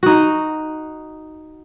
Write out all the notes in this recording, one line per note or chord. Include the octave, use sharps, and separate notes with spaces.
D#4 F#4